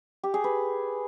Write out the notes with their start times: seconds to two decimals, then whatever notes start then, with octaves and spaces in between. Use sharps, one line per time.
0.23 G4
0.34 G#4
0.44 B4